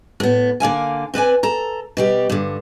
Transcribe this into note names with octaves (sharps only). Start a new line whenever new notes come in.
A2 B3
D3 A#3 F5 G#5
C4 B4 D5 G#5
A4 A#5
B2 G3 G4
G2 D3